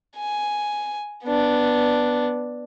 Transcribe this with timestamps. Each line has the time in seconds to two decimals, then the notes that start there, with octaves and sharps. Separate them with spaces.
0.17 G#5
1.25 B3 D4